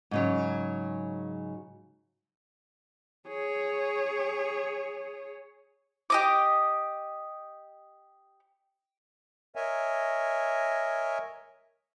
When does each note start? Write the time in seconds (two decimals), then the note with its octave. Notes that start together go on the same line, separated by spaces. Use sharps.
0.11 G#2 C#3 F#3
3.28 G#4 C#5
6.10 G4 D#5 D6
9.56 A#4 C#5 D#5 E5 G#5